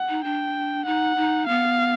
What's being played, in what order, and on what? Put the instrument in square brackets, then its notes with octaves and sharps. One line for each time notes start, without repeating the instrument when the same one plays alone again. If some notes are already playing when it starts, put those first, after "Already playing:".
Already playing: [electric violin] F#5
[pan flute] D#4
[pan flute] D4 [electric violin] G5
[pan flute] D#4 [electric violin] F#5
[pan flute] D#4
[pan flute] B3 [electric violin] F5